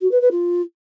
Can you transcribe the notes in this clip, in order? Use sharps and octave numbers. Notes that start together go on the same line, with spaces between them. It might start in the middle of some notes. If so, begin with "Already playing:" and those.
F#4
B4
B4
F4